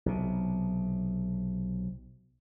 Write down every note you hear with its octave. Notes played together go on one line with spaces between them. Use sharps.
B1 C3